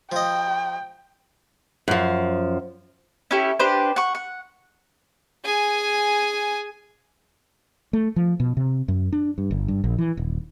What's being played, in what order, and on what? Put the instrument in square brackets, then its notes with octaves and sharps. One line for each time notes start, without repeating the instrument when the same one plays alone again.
[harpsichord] F3 D#5 [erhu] G5
[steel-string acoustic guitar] F#2 F3
[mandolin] C#4 E4 G4 A4
D4 G4 B4 C5
F#5 C#6
F#5
[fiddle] G#4 G#5
[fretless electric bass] A3
F3
B2
C3
F#2
D4
G2
G1
G2
A#1
E3
D#1